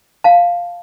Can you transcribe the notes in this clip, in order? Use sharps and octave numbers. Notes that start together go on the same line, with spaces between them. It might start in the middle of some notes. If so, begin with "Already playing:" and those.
F5 A5